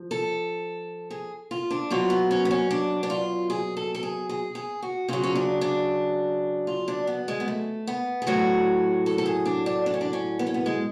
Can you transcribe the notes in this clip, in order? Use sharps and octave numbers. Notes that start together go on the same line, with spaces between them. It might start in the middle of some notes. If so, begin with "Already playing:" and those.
Already playing: F3
A4
G#4
F4
D4
B2 F#3 F4
B3
C#4
B3
C#4
D4
D4
F4
G#4
A4
A4
G#4
G#4
G#4
F#4
C#3 F#3 F4
C#4
D4
D4
F4
D4
B3
G#3
B3
A3
B3
G#4
A2 F#3 F#4
A4
A4
G#4
D4
D4
D4
C#4
D4
C#4
B3
C#4
B3
G#3